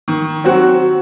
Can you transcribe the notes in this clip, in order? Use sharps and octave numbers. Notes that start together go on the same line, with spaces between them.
D#3
F#3 C4 F#4